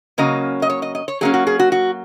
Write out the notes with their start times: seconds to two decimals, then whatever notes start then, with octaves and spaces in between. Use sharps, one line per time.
0.18 C#3 F#3 A#3 C#4 D#5
0.62 D#5
0.70 C#5
0.82 D#5
0.95 D#5
1.08 C#5
1.21 F#3 A#3 C#4 G#4
1.34 F#4
1.47 G#4
1.59 F#4
1.72 F#4